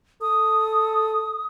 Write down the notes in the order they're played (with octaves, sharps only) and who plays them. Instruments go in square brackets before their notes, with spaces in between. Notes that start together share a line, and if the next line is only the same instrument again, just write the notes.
[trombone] A4 [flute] D#6